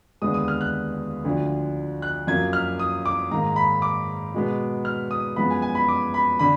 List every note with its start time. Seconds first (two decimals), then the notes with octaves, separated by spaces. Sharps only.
0.22 D#2 D3 G#3 B3 D#6
0.34 D#6
0.48 F6
0.61 F#6
1.25 D2 D3 F3
2.02 F#6
2.27 F#2 F3 A#3 G#6
2.53 F6
2.79 D#6
3.06 D6
3.31 G#2 D#3 A#3 A#5
3.56 B5
3.82 D6
4.34 B2 G#3 B3
4.85 F6
5.11 D#6
5.36 F#2 F3 G#3 B3 B5
5.50 G#5
5.62 G#5
5.75 B5
5.89 D6
6.14 B5
6.39 D3 B5